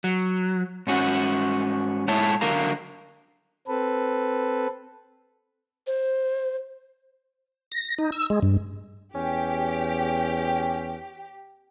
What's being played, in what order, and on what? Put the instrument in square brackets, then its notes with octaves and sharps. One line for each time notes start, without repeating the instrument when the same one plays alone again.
[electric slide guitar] F#3
G#2 C#4 F#4
G#2 E4 C#5 A5
D3 F#3 A#4 F5 A#5
[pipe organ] C4 A4 B4
[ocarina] C5
[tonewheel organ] A#6
D#4
E6
G#3
G2
[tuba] E2 [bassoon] C#4 [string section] G4